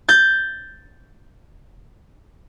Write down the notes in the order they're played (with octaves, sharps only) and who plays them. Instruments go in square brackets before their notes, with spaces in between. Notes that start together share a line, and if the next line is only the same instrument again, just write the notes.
[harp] G6 A6